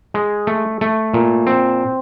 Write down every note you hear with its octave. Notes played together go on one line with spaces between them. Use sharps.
G#3
A3
A3
A#2
C4